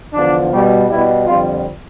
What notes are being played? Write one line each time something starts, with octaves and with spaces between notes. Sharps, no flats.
E2 D3 F3 D4
B2 G3
B2 G3 E4
F2 D3 G3 F4